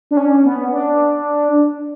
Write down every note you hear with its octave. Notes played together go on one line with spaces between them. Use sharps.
D4
C#4
B3
D4